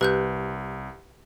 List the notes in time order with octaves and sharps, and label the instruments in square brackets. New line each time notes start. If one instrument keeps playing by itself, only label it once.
[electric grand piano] C2 [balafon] G4 [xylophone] B4 F#6 G6